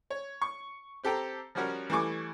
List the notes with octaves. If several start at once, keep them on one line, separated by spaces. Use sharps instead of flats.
C#5
C#6
C4 G4 A4 G5 A#5
F3 G3 C#4 F#4 A#4
E3 G3 A3 G#5 C#6 D6